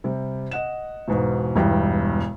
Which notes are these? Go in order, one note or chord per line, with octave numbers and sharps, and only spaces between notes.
C3 G3
D#5 F#5 E7
B1 E2 G#2 B2
E1 B1 G2 E3 G5